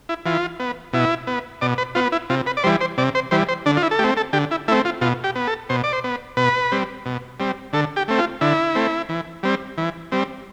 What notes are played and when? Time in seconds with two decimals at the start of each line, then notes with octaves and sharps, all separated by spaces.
0.09 E4
0.25 E3 F4
0.60 B3
0.93 B2 E4
1.27 B3
1.61 B2 D5
1.78 B4
1.95 B3 F4
2.12 E4
2.30 C3 F4
2.46 B4
2.57 D5
2.64 E3 G3 C5
2.81 C5
2.98 C3 D5
3.15 C5
3.31 E3 G3 C5
3.48 C5
3.66 D3 D4
3.77 F4
3.83 E4
3.91 A4
3.99 A3 G4
4.04 C4
4.17 A4
4.33 D3 G4
4.51 E4
4.68 A3 E4
4.72 C4
4.85 F4
5.01 B2 F4
5.24 G4
5.35 B3
5.47 A4
5.69 B2 C5
5.84 D5
5.93 C5
6.04 B3
6.37 B2 B4
6.72 G3 C4
7.06 B2
7.40 G3 C4
7.73 D3 A4
7.96 G4
8.08 A3 C4
8.18 F4
8.41 D3 E4
8.75 A3 C4
9.09 E3
9.43 G3 C4
9.78 E3
10.12 G3 C4